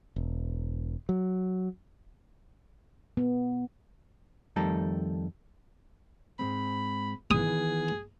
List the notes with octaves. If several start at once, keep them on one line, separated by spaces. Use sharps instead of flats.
E1
F#3
B3
F2 D#3 G3 A3 A4 A#5
G#2 G#3 C4 B5
D#3 E3 B3 G#4 D#6